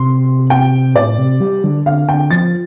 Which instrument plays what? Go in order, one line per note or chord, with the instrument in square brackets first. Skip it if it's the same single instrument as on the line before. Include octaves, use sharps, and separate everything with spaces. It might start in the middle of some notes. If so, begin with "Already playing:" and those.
Already playing: [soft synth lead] C3 [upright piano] C6
[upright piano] G5
[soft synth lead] A2 [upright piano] D5
[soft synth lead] C3
G3
D3
[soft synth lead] D3 [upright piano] F5
[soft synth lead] D3 [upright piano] G5
[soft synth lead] F3 [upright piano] A6